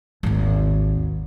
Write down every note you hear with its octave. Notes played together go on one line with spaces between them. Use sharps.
G#1 D#2